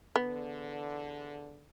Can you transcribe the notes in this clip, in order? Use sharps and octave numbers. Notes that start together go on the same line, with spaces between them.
E2 D3 B3